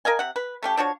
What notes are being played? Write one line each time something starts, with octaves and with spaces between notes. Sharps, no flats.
A#4 D#5 F5 G#5
C3 F#5
B4
A3 C#4 G4
F3 D4 F#4 C#5